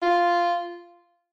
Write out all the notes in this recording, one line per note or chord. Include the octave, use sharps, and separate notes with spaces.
F4